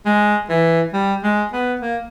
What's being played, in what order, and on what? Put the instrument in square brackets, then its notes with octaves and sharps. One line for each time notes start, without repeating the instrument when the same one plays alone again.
[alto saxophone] G#3
E3
G3
G#3
B3
A#3